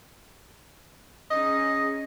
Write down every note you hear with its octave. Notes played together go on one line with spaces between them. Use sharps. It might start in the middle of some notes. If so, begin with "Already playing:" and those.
C#4 D#4 G#4 D#5